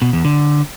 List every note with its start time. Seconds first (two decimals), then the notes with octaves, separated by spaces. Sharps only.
0.02 B2
0.13 E2
0.25 D3